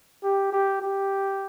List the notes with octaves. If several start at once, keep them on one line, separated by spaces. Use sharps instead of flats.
G4
G4
G4